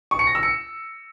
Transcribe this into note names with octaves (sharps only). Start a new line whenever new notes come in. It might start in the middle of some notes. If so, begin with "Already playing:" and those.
C#6
C#7
A#6
E6
C#7